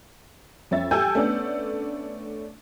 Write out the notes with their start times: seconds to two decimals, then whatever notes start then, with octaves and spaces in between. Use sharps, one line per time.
0.71 F2 C#4 E5 A6
0.91 G4 A4 G5 G#5 E6 G6
1.15 A3 B3 C#4 D4